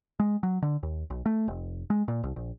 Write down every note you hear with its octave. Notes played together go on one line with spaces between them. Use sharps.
G#3
F#3
D3
D#2
B1
A3
F1
G#3
A#2
C2
A#1